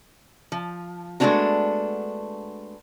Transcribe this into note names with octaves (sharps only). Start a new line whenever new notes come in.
F3
G#3 A3 B3 C#4 D4 F#4